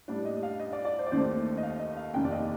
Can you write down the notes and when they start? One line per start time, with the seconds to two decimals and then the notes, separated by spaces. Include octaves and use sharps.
0.08 A2 G3 D4 D5
0.25 D#5
0.43 F5
0.59 D#5
0.73 D5
0.85 D5
0.99 C5
1.07 D5
1.12 D#2 D#3 A3 C5
1.58 D#5
1.63 F5
1.79 D#5
1.97 F5
2.13 F1 D#2 D#3 G5
2.25 D5
2.31 D#5